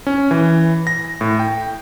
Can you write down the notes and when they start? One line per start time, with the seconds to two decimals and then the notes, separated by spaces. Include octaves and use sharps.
0.07 C#4
0.31 E3
0.87 A#6
1.21 A2
1.39 G5